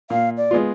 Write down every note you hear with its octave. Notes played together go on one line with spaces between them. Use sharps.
A#2 F5
D5
G#3 B3 F4